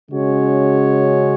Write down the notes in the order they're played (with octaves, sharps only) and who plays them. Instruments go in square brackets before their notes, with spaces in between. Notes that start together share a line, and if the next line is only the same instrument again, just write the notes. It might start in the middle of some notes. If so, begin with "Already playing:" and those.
[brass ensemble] C#3 G#3 C#4 F#4 C#5